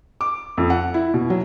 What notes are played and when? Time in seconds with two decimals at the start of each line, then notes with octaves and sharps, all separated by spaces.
0.21 D6
0.58 F2
0.70 F#5
0.94 E4
1.14 B2
1.30 F#3